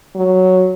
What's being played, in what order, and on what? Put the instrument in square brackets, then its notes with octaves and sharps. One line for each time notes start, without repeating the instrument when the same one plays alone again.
[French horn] F#3